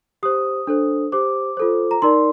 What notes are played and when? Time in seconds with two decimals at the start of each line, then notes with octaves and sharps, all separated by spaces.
0.23 G4 C5 D#6
0.67 D4 A4 C5
1.12 G4 C5 D6
1.57 F4 A4 C5
1.91 A#5
2.02 D#4 A#4 D5 C6